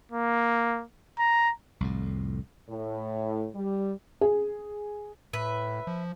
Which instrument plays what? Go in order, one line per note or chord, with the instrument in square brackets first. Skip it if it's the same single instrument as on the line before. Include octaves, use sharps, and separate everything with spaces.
[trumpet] A#3
A#5
[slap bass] C2 F2 A2
[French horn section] A2
G3
[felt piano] G#4
[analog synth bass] A2 [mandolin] B4 E5
[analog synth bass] F3